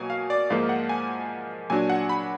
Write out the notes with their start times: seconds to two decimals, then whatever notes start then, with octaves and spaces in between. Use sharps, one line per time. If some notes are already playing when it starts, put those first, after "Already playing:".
Already playing: B2 F#3 A#3 G#5
0.10 F5
0.30 D5
0.50 G#2 F3 A#3 F5
0.69 F#5
0.89 G#5
1.70 A#2 F#3 D4 G#5
1.90 F#5
2.09 B5